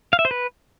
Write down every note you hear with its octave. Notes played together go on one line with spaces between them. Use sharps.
F5
E5
C5
B4